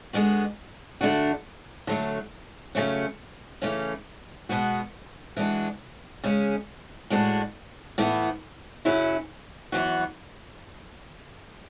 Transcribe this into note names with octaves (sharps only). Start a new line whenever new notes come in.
D3 G#3 B3 F#4
D3 A3 D4 F#4
D3 F#3 A3
C#3 F#3 A3 C#4
C#3 E3 A3 C#4
B2 G#3 B3 F#4
E3 G#3 D4 F#4
C#3 G#3 C#4
A2 G#3 D4 F#4
A2 E3 B3 E4
F#2 C#3 F#3 C#4 E4
F#2 E3 B3 F#4